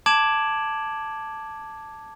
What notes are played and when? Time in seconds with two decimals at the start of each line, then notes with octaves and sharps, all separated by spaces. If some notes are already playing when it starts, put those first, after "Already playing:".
0.06 A5 D6 G#6 D7 E7 F#7